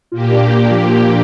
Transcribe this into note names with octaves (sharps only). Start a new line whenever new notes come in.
A#2 A#3 F4 G4
D4
D4
F4
F3